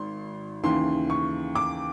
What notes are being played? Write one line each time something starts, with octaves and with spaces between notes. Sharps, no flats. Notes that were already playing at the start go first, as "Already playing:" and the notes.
Already playing: G#1 C6
D#2 C#3 E3 C6
C#6
D6